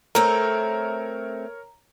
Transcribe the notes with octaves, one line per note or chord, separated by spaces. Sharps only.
A3 C4 A#4 C#5 A#5